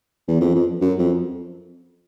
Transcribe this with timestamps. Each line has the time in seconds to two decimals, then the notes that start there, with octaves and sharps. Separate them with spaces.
0.28 E2
0.41 F2
0.55 F2
0.81 F#2
0.99 F2